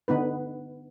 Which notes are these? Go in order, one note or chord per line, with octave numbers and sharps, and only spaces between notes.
D3 B3 D#4 B4